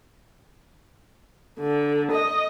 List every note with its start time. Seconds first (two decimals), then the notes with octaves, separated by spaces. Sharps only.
1.59 D3
2.12 D#5